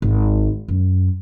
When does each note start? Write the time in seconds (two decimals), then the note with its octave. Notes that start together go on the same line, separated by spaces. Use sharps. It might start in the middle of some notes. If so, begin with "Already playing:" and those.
0.02 G#1
0.68 F#2